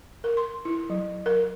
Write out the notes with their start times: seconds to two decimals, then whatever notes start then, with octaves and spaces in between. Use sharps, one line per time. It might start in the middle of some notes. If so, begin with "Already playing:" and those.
0.24 A#4
0.37 C6
0.65 E4
0.90 F#3
1.26 A#4